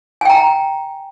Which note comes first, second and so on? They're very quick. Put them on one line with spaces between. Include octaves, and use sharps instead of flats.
G#5 G5 A#5